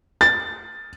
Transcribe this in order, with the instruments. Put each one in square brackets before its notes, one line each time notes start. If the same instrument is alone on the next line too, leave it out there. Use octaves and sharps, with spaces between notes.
[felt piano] A6